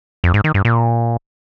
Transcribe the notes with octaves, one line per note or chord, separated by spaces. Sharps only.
F2
G#2
D#3
G2
A#2